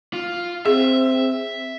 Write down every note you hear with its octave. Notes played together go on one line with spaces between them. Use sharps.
F4
C4 G#4 E5